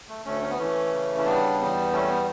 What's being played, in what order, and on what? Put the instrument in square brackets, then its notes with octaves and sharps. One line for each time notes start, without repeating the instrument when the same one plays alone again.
[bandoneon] A3
D2 A3 C#4
C#4
B3
E3 A3 C#4
C#3
C#4
G3 B3 D4
E2 B3
G3 A3 C#4
B3